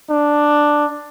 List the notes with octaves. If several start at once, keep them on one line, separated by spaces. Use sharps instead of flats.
D4